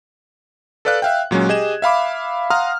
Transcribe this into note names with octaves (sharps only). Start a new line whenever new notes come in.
A4 B4 D5 F5 F#6
E5 F5 G5
A#2 F#3 G#3 C#4
G4 G#4 D#5 G#6 E7
E5 F5 B5 D6
F5 F#5 A#5 C6 D#6 F6